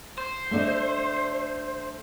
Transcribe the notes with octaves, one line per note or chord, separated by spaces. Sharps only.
C5
A3 D4 D#5